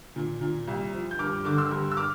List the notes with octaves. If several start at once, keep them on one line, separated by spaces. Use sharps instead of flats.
A#2
A#2
C2
F3
G6
G2 D6 F6
D3 D6
C6 E6
G2
E6
D6 F6